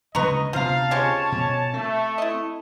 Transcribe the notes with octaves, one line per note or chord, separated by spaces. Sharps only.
D2 C#3 G#3 B4 D#5 A#5 C#6
D2 C3 F3 B3 F5 A5 A#5
F3 G#3 C#4 G4 C#5
B2
A3 C4
E4 D#5